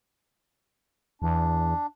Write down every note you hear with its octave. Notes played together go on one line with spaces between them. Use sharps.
E2 D4